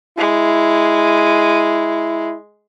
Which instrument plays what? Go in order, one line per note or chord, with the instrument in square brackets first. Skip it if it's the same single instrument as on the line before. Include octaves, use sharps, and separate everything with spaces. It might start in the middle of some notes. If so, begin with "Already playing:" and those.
[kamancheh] G#3 [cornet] E4